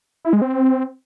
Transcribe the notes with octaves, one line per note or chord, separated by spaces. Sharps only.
E4
G#3
C4